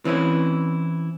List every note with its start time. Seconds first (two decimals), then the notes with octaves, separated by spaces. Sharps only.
0.05 E3 C4 C#4 E4